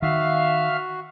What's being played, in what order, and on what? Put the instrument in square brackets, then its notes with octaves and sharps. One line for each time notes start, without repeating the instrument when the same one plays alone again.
[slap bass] D#3 [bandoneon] F#4 [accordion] E5 F5 F6